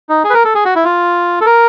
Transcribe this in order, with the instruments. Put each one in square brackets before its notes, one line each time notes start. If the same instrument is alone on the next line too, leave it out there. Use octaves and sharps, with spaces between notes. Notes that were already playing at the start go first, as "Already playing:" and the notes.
[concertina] D#4
G#4
B4
A#4
A4
G#4
F#4
E4
F4
A4
A#4